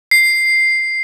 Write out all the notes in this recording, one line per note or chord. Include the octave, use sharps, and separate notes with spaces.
C7